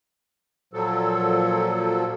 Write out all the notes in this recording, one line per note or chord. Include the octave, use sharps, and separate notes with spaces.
A#2 F3 F#3 A4